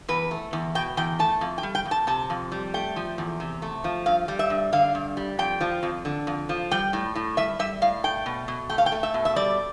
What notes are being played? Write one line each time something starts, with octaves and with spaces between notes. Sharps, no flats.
E2 B4
A3
E2
B2 G5
E2 G5
A3 A5
F2
G5
G3
G5
F2
A5
C3 A5
F2
G3
A3 G5
F3
E2
C3
A3
F3
G2 F5
G3
E5
G2
D3 F5
G2
G3
F2 G5
F3
F2
D3
F2
F3
G3 G5
A2
A2
G3 E5
G3 E5
A2 F5
A3 G5
B2
B2
A3 G5
F5
G5
A3
E5
B2
E5
G3 D5